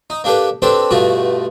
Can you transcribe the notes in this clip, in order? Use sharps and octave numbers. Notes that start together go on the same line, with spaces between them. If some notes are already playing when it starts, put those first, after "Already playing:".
D#4
A#3 D4 G4 A4 B4
C4 D4 G4 A4 B4 C5
G2 B2 A3 F4 F#4